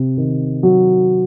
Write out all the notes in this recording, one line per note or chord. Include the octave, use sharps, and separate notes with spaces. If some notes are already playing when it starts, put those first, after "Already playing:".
Already playing: C3
D#3
F#3